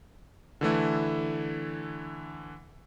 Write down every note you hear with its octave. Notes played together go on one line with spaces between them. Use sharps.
D3 E3 A3 E4